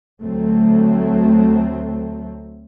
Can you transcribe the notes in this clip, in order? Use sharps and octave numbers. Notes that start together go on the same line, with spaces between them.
D2 F#3 A3 C4